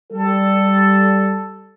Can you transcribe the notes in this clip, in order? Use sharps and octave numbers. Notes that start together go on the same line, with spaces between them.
G3 A4